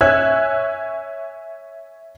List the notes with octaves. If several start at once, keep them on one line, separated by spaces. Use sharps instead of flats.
C#5 E5 G#5 E6 F#6 G#6